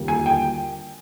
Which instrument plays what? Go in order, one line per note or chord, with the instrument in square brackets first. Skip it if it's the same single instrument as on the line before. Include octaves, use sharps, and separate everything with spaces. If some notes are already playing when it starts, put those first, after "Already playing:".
Already playing: [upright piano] D#2 D3 G3 A#3 F4
[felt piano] G#5
G5